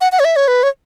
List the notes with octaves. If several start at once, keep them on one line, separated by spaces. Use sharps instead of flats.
F#5
F#5
C#5
E5
C#5
B4
C#5